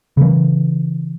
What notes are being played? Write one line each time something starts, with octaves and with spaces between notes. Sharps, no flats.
C#3 E3